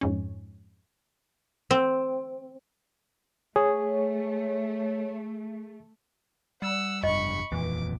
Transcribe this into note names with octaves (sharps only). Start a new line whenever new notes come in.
F2 G#2 C#4
C4
A3 G#4 C#5
G3 F#5 E6
F1 G2 D#5 B5 C#6
D#1 F2 A#2 E3 D6